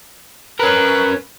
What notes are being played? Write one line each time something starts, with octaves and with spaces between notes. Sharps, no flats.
C#4 A#4 B4